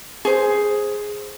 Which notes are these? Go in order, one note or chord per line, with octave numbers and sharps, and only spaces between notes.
G#4 C5